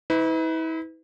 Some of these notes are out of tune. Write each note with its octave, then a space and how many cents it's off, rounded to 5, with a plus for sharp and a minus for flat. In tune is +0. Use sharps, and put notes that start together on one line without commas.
E4 -40 B4 +30